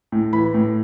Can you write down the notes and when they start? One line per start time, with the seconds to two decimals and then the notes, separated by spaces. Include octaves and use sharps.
0.12 A2
0.33 E3 B5
0.54 A2